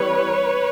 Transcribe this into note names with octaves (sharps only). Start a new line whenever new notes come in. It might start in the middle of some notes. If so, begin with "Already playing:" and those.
Already playing: E3 G3 C4 B4 C#5